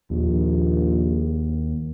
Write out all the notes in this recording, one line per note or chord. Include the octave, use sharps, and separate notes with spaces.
A#1 D#2